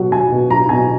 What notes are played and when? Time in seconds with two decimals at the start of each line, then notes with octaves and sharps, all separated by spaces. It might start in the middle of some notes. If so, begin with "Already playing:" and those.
Already playing: B2 F#3 F#5
0.12 F#3 G#5
0.31 B2
0.50 F#3 A#5
0.69 B2 G#5